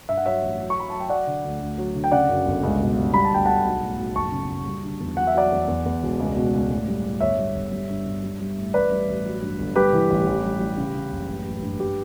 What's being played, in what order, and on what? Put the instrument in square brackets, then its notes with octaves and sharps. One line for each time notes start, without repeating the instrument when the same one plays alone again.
[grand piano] G2 E5
F#5
F#3 C#5 E5
A1
F#3
C#6
F#3 B5
F#3 A5
G5
F#3 D5 F#5
D3
D2
D2
F#3
D3
G5
C#3 D5 F#5
F#2
G1
C#2
B2
G3
G3 B5
A5
D2 G5
D2 F#5 A5
B1
A2
B1
F#1 A5 C#6
C#3
F#1
G3
D3
E2
F#3 F#5
E5
F#3 D5 F#5
E2
E2
E2
E1
C#2
B2
C#2
A2
G3
A2
G1 C#5 E5
G3
G1
G3
G2
G2
G3
G3
A2
A1 B4 D5
G3
A1
F#3
G2
G1
G3 G4 B4
E3
A1
A1
G3
G3
C#3
C#3
F#1
A1
A1
G2
G4